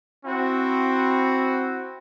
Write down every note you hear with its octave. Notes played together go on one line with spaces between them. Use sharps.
C4 E4 F#4